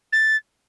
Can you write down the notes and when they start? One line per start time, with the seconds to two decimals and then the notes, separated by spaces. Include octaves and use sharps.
0.12 A6